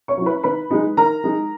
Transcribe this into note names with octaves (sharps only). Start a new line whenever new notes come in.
C#5 C#6
F#3 C#4 E4
B4 B5
D#3 B4 B5
G#3 D#4
D#3 A#4 A#5
G#3 D#4